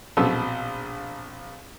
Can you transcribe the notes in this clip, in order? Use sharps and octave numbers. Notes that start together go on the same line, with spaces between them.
A#1 B2 C4 A4 E6